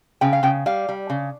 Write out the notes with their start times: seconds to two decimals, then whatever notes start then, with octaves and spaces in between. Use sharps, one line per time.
0.21 C#3 G5
0.33 F5
0.43 C#3 G5
0.66 G3 F5
0.89 G3
1.10 C#3